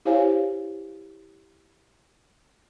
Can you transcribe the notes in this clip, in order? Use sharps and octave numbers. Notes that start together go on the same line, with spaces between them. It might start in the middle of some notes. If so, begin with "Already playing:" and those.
E4 G4 C5 C#5 F5 G#5